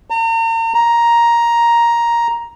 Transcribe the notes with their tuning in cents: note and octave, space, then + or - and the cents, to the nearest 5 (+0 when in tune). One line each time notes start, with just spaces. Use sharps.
A#5 -40
A#5 +10